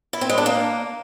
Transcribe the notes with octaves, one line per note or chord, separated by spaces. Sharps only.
E4
C4
G#3
D4
A#3